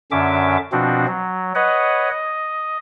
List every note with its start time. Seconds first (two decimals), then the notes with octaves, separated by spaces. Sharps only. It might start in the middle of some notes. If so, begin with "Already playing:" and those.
0.11 F#2 D3 C#4 E5 D6
0.72 B2 F3 C4 D4 F#4
1.07 F#3
1.55 B4 C#5 D#5 F#5
2.10 D#5